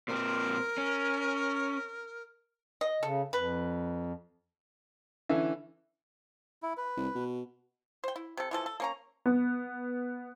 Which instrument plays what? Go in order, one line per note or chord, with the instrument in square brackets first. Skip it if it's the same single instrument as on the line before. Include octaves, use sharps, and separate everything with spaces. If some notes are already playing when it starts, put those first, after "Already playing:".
[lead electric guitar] A#2 C4 [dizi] A#4
[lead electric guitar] C#4
[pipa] D#5
[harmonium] C#3 [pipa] A4
[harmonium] F2 [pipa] B4
[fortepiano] D3 E3 C#4 [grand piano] E5
[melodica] E4
B4
[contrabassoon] C2
B2
[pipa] C5 G5
E4
C3 A4
E3 F3 A4
A4
A#3 C#4 A#5
[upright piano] B3